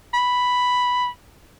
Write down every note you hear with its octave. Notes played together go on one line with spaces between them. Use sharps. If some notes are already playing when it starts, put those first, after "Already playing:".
B5